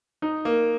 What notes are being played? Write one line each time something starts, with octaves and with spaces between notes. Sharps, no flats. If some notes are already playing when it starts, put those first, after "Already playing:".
D#4
A#3